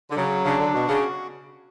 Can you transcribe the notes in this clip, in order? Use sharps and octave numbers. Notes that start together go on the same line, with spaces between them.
D3
C#3 F#3
C#3 D4
D3
B2 F#4
C#3